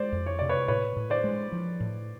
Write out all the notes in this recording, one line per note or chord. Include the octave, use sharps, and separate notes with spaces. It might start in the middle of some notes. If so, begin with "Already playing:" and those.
Already playing: G#3 C5 D5
F2
C#5
C3 D5
B4 C#5
A2 B4 C#5
A2
C5 D5
G#3
F3
A2